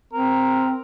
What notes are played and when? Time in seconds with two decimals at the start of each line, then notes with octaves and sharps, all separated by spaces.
0.13 C4 A#4